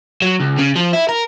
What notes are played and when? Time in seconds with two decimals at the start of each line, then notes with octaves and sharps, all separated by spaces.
0.22 F#3
0.40 C#2
0.58 C#3
0.75 F3
0.93 E4
1.09 A#4